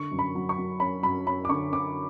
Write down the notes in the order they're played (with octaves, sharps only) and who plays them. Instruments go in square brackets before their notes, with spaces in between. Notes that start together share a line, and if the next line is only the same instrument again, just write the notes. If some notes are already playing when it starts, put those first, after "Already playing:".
Already playing: [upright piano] D3 C#6
F#2
B5
F#3
C#6
F#3
C#4 B5
F#2 B5
C#4 B5
D6
D3 C#6
D3 D6